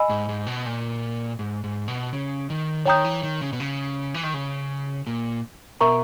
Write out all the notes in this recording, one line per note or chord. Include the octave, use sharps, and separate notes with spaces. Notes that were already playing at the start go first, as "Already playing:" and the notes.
Already playing: D#5 G#5 B5 E6
G#2
G#2
B2
A#2
G#2
G#2
B2
C#3
D#3
D#3 C#5 G5 A#5 D#6 G6
E3
D#3
C#3
B2
C#3
E3
D#3
C#3
A#2
B2 A#4 E5 A#5 C#6